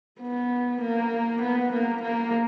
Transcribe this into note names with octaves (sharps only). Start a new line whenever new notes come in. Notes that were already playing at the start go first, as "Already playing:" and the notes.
B3
A#3
B3
A#3
A#3